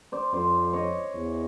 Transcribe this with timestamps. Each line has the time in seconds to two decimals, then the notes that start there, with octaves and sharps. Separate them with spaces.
0.12 C5 D5
0.33 F2 C5 D5
0.73 C#5 D#5
1.14 E2